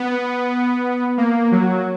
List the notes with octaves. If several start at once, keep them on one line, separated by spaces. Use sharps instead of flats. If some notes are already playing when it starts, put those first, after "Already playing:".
Already playing: B3
A#3
F#3